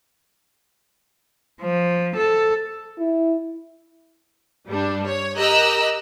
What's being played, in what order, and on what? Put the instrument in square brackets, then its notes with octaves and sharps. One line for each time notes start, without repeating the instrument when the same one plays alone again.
[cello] F3
A4
[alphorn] E4
[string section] G2 G3 D4
C#5
G4 A#4 D#5 A#5 E6 F#6